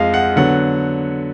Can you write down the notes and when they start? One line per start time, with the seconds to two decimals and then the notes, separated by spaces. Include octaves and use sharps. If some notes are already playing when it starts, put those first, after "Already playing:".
Already playing: F2 F3 G#3 D#5 F5
0.14 F#5
0.36 D3 F#3 B3 F#5